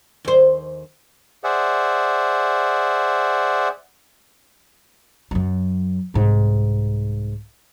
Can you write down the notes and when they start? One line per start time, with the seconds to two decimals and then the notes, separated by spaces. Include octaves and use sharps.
0.25 D#2 C5
1.44 G#4 C5 D5 E5 F#5
5.31 F#2 F#3
6.14 C2 G#2